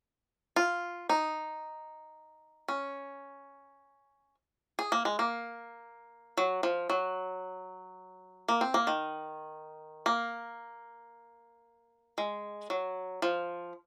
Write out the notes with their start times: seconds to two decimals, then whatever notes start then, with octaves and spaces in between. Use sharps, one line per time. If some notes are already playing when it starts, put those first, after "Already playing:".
0.56 F4
1.09 D#4
2.68 C#4
4.79 G#4
4.92 A#3
5.05 G#3
5.19 A#3
6.37 F#3
6.63 F3
6.90 F#3
8.48 A#3
8.61 C4
8.74 A#3
8.87 D#3
10.06 A#3
12.18 G#3
12.70 F#3
13.22 F3